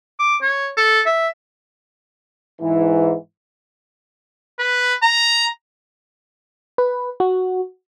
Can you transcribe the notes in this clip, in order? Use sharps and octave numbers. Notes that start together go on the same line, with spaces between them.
D6
C#5
A4
E5
G#2 E3
B4
A#5
B4
F#4